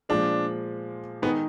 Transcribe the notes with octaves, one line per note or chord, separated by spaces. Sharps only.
A#2 F3 G#3 D4
D#3 G#3 B3 D#4 G#4